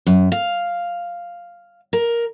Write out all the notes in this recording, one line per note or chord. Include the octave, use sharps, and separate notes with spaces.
F#2
F5
A#4